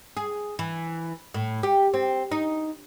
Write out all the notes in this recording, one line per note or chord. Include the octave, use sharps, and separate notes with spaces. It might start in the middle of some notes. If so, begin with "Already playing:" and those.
G#4
E3
A2
G4
C4
D#4